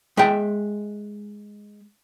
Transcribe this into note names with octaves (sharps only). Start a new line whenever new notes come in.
G#3 E5 G5